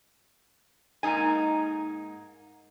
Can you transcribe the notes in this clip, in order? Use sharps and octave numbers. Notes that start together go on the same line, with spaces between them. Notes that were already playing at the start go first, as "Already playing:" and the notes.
G#2 A#3 D#4 G#5